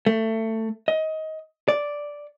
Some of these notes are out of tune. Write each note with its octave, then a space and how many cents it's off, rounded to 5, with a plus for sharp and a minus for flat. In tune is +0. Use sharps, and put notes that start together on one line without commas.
A3 +20
D#5 +20
D5 -5